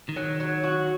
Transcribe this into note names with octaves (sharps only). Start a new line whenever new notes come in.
D#3
F#3
F#3
F#4